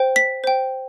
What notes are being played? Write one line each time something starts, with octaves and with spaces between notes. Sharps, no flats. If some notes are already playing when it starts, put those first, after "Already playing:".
Already playing: C5 G5
B6
C5 G5